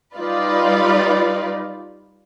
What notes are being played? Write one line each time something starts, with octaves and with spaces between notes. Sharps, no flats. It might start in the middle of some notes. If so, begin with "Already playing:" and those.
G3 D#4 F4 B4 D5